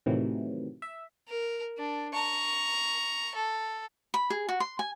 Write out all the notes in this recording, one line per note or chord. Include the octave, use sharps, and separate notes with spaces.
A2 C3 D#3 E3 F#3
E5
A#4
D4
A#5 C#6
A4
B5
G#4
F#4
C6
G#5